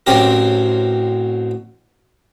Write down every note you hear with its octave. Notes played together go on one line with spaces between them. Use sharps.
A1 F#3 C4 G4 A#4